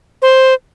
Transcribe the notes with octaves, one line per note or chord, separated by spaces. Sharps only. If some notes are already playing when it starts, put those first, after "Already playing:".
C5